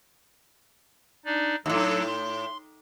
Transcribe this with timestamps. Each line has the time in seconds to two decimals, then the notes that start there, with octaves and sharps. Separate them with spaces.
1.25 D4 D#4 D5
1.66 D#2 A2 F#3 D4 A4
2.07 C6